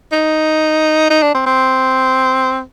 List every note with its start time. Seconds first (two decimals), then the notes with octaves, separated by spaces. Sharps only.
0.12 D#4
1.10 D#4
1.22 D4
1.35 C4
1.46 C4